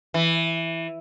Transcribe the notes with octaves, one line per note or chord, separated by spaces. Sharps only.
E3